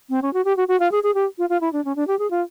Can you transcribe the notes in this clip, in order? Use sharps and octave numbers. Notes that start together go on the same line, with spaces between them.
C4
C#4
F#4
G4
F#4
F#4
F4
G#4
G#4
G4
F4
F4
E4
D4
C#4
D4
G4
G#4
F4